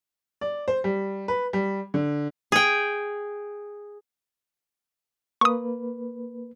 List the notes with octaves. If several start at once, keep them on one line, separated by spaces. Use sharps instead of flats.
D5
C5
G3
B4
G3
D3
G#4 G5
A#3 B4 C#6 D#6